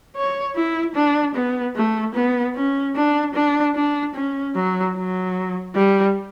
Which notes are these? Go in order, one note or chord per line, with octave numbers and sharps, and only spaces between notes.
C#5
E4
D4
B3
A3
B3
C#4
D4
D4
D4
C#4
F#3
F#3
G3